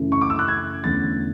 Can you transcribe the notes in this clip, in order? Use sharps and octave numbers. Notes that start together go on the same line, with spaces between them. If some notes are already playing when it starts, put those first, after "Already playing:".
Already playing: F#2 C#3 E3 A3
C#6
D6
E6
F#6
G#6
E2 D3 A3 C#4 A6